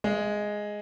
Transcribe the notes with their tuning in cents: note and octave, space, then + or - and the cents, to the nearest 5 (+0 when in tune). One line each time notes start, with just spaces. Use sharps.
G#3 +0 E5 +45